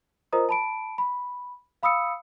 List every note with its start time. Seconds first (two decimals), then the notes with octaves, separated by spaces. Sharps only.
0.33 F4 A#4 C5 D#5 A#5 D#6
0.49 A5 B5 D7
0.98 B5
1.83 F5 B5 D#6 E6 C#7